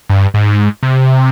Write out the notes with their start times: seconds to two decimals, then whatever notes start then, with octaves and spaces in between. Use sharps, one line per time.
0.09 G2
0.34 G#2
0.83 C3